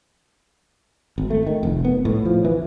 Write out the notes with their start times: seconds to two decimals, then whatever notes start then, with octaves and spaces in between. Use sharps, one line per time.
1.18 G#1
1.30 A3
1.47 D#3
1.63 F1
1.85 B3
2.05 A2
2.25 F3
2.45 E3